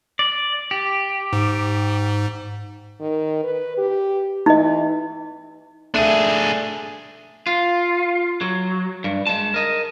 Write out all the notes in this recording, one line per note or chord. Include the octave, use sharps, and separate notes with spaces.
D5
G4
G#2
D#3
B4
G4
E3 D#4 D#5
A3 D4 G#4 D#7
F4
F#3
G2
G#3 A5
A#4 D#5